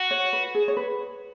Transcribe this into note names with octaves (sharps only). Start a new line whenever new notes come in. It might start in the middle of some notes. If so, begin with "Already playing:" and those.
Already playing: F#4
C#5
B4
G#4
C#5
B4